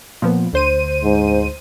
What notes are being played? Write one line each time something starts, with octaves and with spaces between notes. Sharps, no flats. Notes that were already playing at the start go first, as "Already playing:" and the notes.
A#2 F3 B3
D2 C5 D#7
G#2